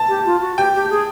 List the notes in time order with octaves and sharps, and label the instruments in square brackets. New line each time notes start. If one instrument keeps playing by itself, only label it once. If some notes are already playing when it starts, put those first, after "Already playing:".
Already playing: [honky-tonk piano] A5
[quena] G4
F4
F#4
[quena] G4 [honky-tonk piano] G5
[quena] G4
G#4